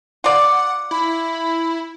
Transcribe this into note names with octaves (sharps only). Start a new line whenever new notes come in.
F4 D5 F#5
E4 B5